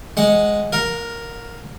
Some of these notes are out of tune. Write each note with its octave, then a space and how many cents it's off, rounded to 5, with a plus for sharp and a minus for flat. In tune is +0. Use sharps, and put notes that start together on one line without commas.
G#3 +0 F#5 +0
A#4 +0 F#5 -45